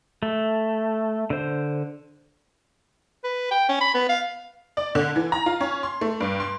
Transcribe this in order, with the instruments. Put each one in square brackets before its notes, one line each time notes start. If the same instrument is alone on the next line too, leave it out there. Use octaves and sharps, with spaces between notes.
[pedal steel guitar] A3
D3 C5
[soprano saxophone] B4
G5
C#4
B5
B3
F5
[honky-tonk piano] D5
D3
E3
A#5
F4
C#4
C6
A3
G2
C6